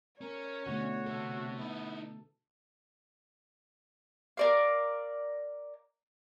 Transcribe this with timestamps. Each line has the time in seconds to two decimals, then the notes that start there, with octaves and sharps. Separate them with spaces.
0.21 C#4 A#4 C#5
0.66 B2 D3 A3 F#4
1.06 C3 A4
1.59 B3 D#4 E4
4.37 A#4 D5 F5